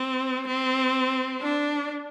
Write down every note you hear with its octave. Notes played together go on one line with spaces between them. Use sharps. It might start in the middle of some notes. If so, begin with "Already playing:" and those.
Already playing: C4
C4
D4